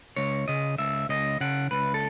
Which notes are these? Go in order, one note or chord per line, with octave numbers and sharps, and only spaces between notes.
C#2 C#5
C#3 D#5
C#2 E5
C#2 D#5
C#3 F#5
C#2 B4
A4